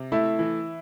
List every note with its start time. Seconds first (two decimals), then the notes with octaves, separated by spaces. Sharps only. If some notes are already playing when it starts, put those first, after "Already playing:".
Already playing: C3
0.12 A3 E4
0.39 E3